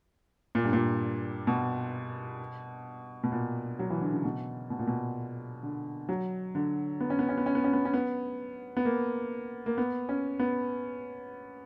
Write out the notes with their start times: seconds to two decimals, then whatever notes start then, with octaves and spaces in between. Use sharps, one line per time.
0.55 A#2
0.64 G2
0.73 A#2
1.47 B2
3.24 B2
3.32 A#2
3.79 F#3
3.90 E3
4.01 D3
4.13 C#3
4.25 B2
4.70 B2
4.79 A#2
4.87 B2
5.63 D3
6.09 F#3
6.55 D3
7.00 B3
7.10 C#4
7.19 B3
7.29 C#4
7.37 B3
7.46 C#4
7.55 B3
7.64 C#4
7.73 B3
7.85 C#4
7.93 B3
8.77 B3
8.85 A#3
9.66 A#3
9.78 B3
10.09 C#4
10.39 B3